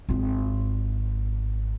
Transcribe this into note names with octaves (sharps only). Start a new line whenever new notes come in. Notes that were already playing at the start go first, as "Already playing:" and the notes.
G#1 F4